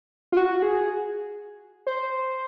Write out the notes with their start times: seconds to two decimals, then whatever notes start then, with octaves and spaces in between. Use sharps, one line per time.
0.32 F4
0.37 F#4
0.62 G#4
1.87 C5